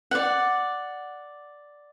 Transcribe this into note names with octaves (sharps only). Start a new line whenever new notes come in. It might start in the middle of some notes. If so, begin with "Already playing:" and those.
D5 F#5